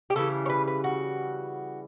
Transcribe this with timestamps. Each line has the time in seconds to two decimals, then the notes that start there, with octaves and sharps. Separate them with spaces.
0.10 G4
0.16 C#3 E3 G3 A4
0.45 C#5
0.49 B4
0.67 B4
0.84 F#4